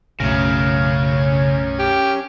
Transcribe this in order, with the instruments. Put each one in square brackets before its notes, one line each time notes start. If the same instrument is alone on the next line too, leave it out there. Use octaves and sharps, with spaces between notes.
[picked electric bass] B1 F#2 A3 [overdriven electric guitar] C#3 [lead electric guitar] C#4 A#4
[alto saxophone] G4